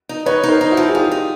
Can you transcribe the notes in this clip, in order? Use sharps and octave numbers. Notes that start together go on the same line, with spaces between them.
D#4
D#4 B4 C#5
D#4
A#4 C5
D#4
E4 F#4
F3
G#4
D#4 F4 G4
D#4